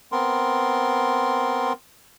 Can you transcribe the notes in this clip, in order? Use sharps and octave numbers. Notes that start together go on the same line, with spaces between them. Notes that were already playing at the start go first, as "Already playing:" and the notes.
B3 C4 A#4 C6